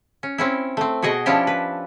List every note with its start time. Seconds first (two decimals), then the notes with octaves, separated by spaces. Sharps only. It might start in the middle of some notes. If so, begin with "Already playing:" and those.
0.23 C#4
0.38 C4 C#4 E4
0.77 A3 C4
1.02 B2 F#4 G#4 D#5 G5
1.26 F3 C#4 D4 E4 G4
1.47 B4